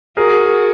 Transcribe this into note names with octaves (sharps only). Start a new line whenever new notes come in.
F#4 G#4 A#4